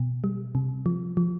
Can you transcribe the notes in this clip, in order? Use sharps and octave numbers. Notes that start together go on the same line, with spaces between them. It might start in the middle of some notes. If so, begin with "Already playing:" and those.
Already playing: B2
G3
C3
F3
F3